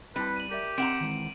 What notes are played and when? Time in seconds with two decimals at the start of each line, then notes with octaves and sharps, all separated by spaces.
0.16 G3 C4 E4 B4 A5
0.36 D#7 F#7
0.51 G4 A#4 D5 E5
0.78 C4 F#5 A#5 D7 E7 F#7
1.01 D#3 E3 G#3